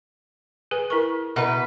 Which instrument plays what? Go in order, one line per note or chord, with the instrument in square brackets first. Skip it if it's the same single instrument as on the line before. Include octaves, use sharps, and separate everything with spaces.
[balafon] G#4 B4 G#5
E4 A#4 C#6
[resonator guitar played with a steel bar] B2 B4 [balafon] E5 F#5 A#5